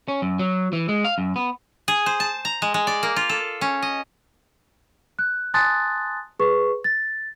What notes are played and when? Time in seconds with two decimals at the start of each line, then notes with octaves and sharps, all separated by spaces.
0.08 C#4
0.22 F#2
0.39 F#3
0.73 E3
0.89 G#3
1.05 F5
1.18 F#2
1.36 B3
1.88 G#4
2.06 C5
2.20 A5
2.45 A#5
2.62 G#3
2.74 G#3
2.87 D5
3.03 A#3
3.16 F4
3.29 A4
3.61 C#4
3.82 D#5
5.19 F#6
5.54 G#5 A5 C6 D#6 F#6 A6
6.39 G#4 B4 C#6
6.84 A6